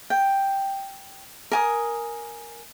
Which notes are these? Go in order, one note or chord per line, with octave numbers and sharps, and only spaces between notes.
G5
A#4 G#5 D#6